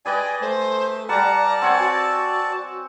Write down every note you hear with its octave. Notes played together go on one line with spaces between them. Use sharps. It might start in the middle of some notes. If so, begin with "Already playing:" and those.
G#4 B4 D5 D#5 G5 G#5
A3 C5
G3 D5 F#5 A5 A#5
C4 C#5 F#5 G#5
F#4